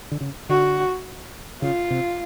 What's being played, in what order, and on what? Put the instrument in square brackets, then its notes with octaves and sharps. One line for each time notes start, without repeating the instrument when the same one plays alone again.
[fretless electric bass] D3
C#3
[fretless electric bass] D3 [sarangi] F#4
[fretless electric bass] C#3 [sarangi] F4
[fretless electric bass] C3